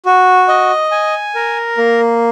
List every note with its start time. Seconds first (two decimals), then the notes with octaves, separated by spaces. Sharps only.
0.05 F#4
0.48 D#5
0.91 G#5
1.35 A#4
1.78 A#3